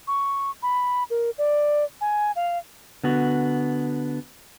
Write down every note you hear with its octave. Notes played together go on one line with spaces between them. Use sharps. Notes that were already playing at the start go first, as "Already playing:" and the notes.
C#6
B5
A#4
D5
G#5
F5
D3 B3 F#4